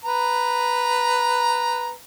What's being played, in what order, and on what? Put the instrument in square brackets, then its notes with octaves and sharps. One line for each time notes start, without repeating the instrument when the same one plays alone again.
[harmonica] B4 A#5